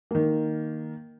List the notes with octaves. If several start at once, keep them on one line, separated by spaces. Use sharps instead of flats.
D#3 A#3